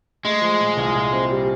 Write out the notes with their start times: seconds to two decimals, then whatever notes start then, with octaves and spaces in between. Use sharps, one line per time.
0.24 G#3 A3
0.42 F3
0.60 A#2
0.77 C2
0.95 A#2
1.13 C4
1.30 G3